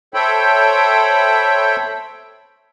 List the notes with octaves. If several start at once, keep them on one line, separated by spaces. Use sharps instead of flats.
A4 C5 C#5 E5 G5 B5